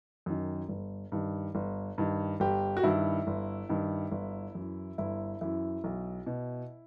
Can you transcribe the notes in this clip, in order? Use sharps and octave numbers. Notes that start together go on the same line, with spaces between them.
F#2 D#3
G1
G2 D#3
G1
G2 D#3
G1 G4
F#4
G2 D#3 E4
G1
G2 D#3
G1
F#2 E3
G1 E4
F#2 E3 E4
B1
B2